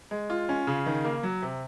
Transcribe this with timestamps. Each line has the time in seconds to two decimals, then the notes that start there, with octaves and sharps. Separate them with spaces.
0.11 G#3
0.30 F4
0.49 C#4
0.67 C#3
0.86 D#3
1.05 A#3
1.23 F#3
1.42 C3